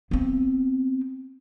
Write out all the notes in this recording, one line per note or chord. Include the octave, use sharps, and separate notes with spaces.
B3 C4